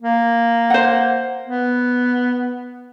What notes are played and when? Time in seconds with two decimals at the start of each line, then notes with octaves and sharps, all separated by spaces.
0.02 A#3
0.70 C5 F#5
1.47 B3